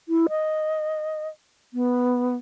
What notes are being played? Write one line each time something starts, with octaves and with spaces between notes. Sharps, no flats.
E4
D#5
B3